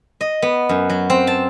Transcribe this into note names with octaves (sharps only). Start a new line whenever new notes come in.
D#5
B3
F#2
F#3
C4
A5